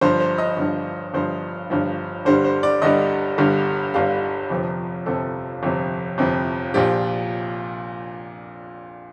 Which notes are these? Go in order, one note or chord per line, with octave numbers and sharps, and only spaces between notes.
G1 G2 F3 C5
C5
D#5
G1 G2 F3
G1 G2 F3 C5
G1 G2 F3
G1 G2 D3 G3 C5
C5
D5
G1 G2 D3 G3 D#5
G1 G2 D3 G3
G1 G2 D3 G3 F5
G1 F2 C3 F3
G1 F2 C3 F3 A4
G1 F2 C3 F3
G1 F2 C3 F3
A#1 A#2 F3 G4